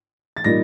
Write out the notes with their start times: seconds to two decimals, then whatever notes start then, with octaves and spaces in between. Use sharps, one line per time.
0.37 A6
0.44 A#2 G3 A#3 D#4 A#6